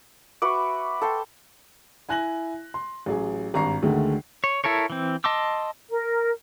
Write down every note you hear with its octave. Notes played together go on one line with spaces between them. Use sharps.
F#4 B4 E5 C#6 D6
A4 G5 C6
E4 G#5 F#6 A#6 F#7
C6
A1 F#3 G#4
G#1 G2 A#5 C#6 C7
D2 D3 D#3 G#3 A3
C#5
E4 A4 A#4 C#5
E3 C4
D#5 A5 C6 D6 E6
A#4